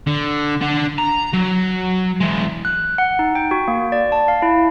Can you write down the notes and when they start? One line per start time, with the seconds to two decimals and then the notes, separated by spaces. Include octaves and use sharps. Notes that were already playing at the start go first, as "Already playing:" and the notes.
0.07 D3
0.61 D4 F#5
0.98 A#5
1.34 F#3
2.21 E3 G#3
2.65 F#6
2.98 F#5
3.19 D#4
3.35 G5
3.51 F#4
3.68 A#3
3.92 D5
4.12 A5
4.28 F5
4.42 E4